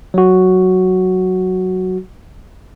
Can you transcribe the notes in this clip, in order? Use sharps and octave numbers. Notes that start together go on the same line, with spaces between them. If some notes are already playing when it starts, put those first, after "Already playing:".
F#3 F#4